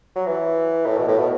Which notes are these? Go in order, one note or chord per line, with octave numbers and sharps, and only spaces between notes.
F#3
E3
A2
B2
A2
B2